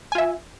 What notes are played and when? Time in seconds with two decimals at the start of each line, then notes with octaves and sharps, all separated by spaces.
0.12 G#5
0.15 F4
0.18 E5